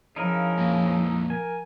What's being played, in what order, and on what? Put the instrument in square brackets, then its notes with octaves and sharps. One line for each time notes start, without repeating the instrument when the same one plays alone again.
[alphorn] C#3 [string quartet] F3 [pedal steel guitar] D#4 E4 A#4
[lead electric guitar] F2 A#2
[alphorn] A#4 [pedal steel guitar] G#5